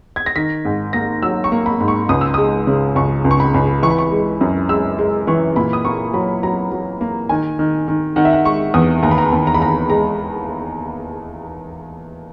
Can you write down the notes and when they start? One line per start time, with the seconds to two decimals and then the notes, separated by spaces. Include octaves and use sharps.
0.16 G#6
0.26 A#6
0.36 D#3 B6
0.65 G#2
0.93 A#3 A#6
1.23 F#3 E6
1.44 C#6
1.52 A#3
1.66 B5
1.80 G#2
1.88 C#6
2.09 C#2 D#6
2.21 E6
2.34 G#3 D#6
2.67 C#3
2.95 C#2 C#6
3.25 C#2
3.31 C#6
3.40 B5
3.54 C#2
3.83 E3 C#6
3.91 B5
3.98 C#6
4.12 G#3
4.41 F#2
4.69 G#3 E6
4.98 G#3
5.27 E3 C#6
5.56 A#2 B5
5.73 D#6
5.85 A#3 C#6
6.13 F#3 B5
6.43 F#3 A#5
6.71 F#3
7.01 A#3
7.29 D#3 G#5
7.59 D#3
7.88 D#3
8.16 D#3 F#5
8.25 E5
8.33 F#5
8.45 G#3 C#6
8.74 E2 D#6
9.03 D#2 A#5
9.11 B5
9.18 A#5
9.33 D#2
9.47 A#5
9.55 B5
9.61 D#2 A#5
9.90 G#3 A#5